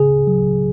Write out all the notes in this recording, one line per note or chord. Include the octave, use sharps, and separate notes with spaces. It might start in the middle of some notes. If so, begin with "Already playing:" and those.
Already playing: C#3 G#4
F#3